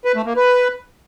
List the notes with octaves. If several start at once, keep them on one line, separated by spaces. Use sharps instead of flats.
B4
A3
A#3
B4